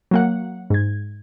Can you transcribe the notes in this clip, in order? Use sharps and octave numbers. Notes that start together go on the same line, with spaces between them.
F#3 A#3 F#5
G#2 G#6